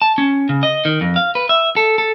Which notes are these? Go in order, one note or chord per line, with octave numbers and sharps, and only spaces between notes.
A5
C#4
C#3
D#5
D#3
F2
F5
B4
E5
A4
A4